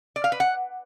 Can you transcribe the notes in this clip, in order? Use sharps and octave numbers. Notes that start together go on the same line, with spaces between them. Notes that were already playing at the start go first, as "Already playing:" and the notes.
D5
F5
B4
F#5